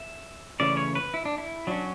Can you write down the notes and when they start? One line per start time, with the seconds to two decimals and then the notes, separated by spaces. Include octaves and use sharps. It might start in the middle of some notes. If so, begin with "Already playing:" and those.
Already playing: E5
0.60 C#3 E3 A3 C#4 D5
0.77 C#5
0.95 B4
1.14 E4
1.25 D4
1.38 E4
1.67 F#3 C#4 D4